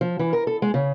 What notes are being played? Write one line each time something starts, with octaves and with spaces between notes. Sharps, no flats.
F3
E3
A#4
A4
G#3
C#3